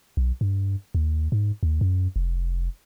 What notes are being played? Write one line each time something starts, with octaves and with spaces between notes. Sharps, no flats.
B1
G2
D#2
G#2
D#2
F#2
F1